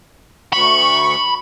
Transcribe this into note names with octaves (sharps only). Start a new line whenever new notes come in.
D2 B5 C#6